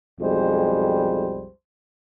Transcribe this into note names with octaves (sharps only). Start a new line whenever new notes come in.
B1 F2 G3 G#3 C5